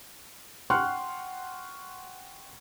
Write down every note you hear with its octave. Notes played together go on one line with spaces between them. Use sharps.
F#5 G5 C6 C#6 F6 F#6